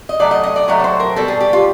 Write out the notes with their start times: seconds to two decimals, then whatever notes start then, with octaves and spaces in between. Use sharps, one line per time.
0.09 D#5
0.20 A2 F#3 A3 D5
0.31 D#5
0.43 D#5
0.56 D5
0.68 A2 F#3 A3 C#5
0.80 C#5
0.84 C5
1.00 A#4
1.16 B2 G3 A4
1.28 G#4
1.40 G4
1.53 F4